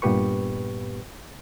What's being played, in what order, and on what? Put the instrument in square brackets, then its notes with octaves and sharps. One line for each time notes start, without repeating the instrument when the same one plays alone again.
[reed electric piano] G2 A#2 B3 G4 B4 C#6